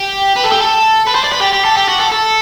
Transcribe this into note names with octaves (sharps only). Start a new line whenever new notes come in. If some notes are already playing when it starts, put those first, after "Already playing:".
Already playing: G4
B4
A4
G4
A4
B4
C5
D5
B4
G4
G4
A4
G4
F#4
A4
A4